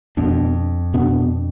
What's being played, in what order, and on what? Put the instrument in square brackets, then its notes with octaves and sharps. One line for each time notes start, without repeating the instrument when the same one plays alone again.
[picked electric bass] F2 [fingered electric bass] B2 B3 D4
[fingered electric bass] B2 B3 D4